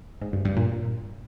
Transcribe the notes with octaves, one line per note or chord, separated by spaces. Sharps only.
G#2
G2
G2
A#2